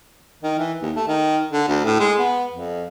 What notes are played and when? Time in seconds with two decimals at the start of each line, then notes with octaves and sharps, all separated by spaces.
0.43 D#3
0.58 E3
0.82 D#2
0.96 A3
1.08 D#3
1.52 D3
1.69 D2
1.85 A2
2.00 G#3
2.19 B3
2.51 F2